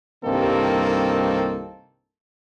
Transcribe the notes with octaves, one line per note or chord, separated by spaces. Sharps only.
C2 G2 D#3 A#3 C4 A4